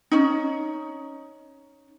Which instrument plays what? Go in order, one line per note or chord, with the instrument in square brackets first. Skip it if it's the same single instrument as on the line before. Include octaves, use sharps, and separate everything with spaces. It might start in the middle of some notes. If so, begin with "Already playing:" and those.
[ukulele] C#4 D#4